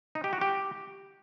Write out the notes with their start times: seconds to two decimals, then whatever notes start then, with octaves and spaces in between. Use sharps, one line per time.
0.15 D#4
0.24 G4
0.33 F#4
0.41 G4